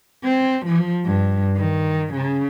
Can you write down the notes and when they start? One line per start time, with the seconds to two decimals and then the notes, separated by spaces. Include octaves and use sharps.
0.24 C4
0.66 F3
1.05 G2
1.56 D#3
2.14 C#3